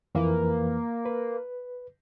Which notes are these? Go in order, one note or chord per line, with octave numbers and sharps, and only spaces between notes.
F2 E3 A#3 B4
B4